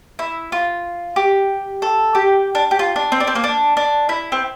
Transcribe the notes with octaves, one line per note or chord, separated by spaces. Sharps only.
E4
F4
G4
A4
G4
D4
G4
F4
D4
C4
D4
C4
A#3
D4
D4
E4
C4